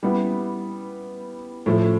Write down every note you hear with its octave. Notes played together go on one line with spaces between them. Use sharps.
G3 B3 E4
A2 F3 A3